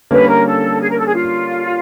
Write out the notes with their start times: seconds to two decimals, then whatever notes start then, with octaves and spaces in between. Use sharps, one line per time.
0.11 D3 G3 A#3 C#4 B4
0.27 A#4
0.46 A4
0.80 G#4
0.89 A#4
0.97 A4
1.06 G#4
1.14 F4